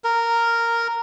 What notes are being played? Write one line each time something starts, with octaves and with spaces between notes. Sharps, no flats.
A#4